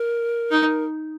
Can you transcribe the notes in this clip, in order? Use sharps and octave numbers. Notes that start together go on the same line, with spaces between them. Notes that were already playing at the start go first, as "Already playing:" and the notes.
Already playing: A#4
D#4